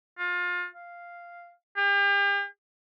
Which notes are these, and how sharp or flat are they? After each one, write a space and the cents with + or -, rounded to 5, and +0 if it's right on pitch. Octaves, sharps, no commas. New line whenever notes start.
F4 +30
F5 -5
G4 +40